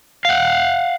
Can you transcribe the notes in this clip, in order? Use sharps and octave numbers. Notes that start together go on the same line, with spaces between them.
F5 F#5